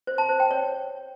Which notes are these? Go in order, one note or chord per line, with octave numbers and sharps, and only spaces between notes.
C5
A5
C5
G5
C#5